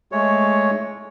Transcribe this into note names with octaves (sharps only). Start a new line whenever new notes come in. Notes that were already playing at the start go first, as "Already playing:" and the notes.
G#3 A3 C#5